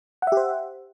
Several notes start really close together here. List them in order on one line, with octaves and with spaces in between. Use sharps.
F#5 E5 G4 C5